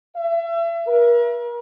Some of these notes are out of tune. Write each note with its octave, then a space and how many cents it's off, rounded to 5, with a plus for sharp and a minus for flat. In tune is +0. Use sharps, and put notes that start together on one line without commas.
E5 +35
A#4 +40